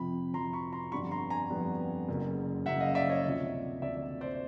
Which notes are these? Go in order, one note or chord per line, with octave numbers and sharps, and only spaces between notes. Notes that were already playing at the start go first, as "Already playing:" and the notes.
Already playing: F2 C3 F3 B5
F2 C3 F3 A#5 C6
B5 C#6
A#5 C6
G1 F2 D3 G3 B3 B5 C#6
A#5 C6
G#5 A#5
G1 F2 D3 G3 B3
F#1 F#2 C#3
F#1 F#2 C#3 E5 F#5
D#5 F5
D5 E5
C#5 D#5
D2 C3 F3
D2 C3 F3 D5 E5
C5 D5